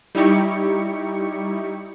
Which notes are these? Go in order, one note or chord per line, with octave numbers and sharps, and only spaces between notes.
G3 D#4 E4 G4 C#6 C#7